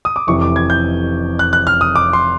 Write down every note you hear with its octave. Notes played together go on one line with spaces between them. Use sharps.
D#6
D6
F1 F2 C3 E3 C#6
D6
G#6
G6
F#6
F#6
F6
D#6
D6
C6